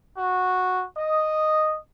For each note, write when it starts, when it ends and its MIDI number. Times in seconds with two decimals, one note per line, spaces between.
0.16 0.84 66
0.96 1.77 75